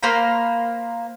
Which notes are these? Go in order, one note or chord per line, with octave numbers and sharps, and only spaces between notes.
A#3 C5 A#5 B5